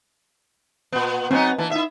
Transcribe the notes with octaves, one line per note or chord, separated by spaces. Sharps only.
A#2 B3
F#3 B3 C4 D#4 C5 G#5
E3 A#3 D4 A5
D#4 E4 E5